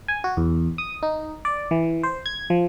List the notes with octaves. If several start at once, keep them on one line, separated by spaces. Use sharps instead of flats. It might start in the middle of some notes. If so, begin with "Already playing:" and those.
G#5
F#4
E2
D#6
D#4
D5
E3
C5
G#6
F3